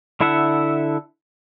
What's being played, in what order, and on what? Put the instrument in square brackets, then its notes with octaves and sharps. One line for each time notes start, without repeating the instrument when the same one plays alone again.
[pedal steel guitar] D3 E4 A4 E5 F#5